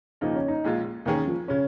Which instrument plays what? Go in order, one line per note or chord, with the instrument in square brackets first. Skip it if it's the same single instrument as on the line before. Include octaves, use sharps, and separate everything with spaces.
[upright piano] D#2 C#3 F3 A#3 [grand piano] D#4
[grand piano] C#4
D#4
[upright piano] A#1 A#2 G#3 F4
[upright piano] D#2 D#3 C#4 G#4 [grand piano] A#3
[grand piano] F3
[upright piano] C#3 [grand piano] C#4